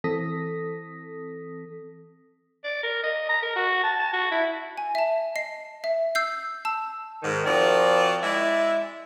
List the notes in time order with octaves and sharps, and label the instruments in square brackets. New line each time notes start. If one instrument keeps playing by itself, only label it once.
[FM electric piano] E3 C4 A4 D#6 A#6 B6
[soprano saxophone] D5
A#4
D#5
A#5
A#4
F#4
A5
A5
F#4
E4
[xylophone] G#5
E5 A5
D#5 C7
E5
E6 G6 C7
A5 E6
[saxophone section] G#2 D#3
F3 C4 F#4 A#4 D5
G#3 E4 D5 E5